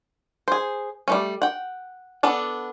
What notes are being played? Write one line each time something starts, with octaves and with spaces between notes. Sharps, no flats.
G#4 C5
G3 A3 C#4
F#5 G5
B3 D4 A4